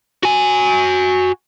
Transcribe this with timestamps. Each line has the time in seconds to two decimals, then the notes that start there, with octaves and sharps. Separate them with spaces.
0.23 F#4 G#5